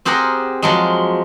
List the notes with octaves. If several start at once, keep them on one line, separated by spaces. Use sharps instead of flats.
C4 G4 G#4 A#4 F#5 A#5
F3 F#3 G#3